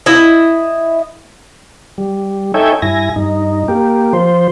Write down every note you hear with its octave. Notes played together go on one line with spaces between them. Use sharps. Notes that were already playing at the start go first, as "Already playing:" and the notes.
E4 D#5
G3
D#4 A4 C#5 E5 G5 G#5
G2 E4 G#5 A#6
G2 D#4
A#3 G4
F3 C5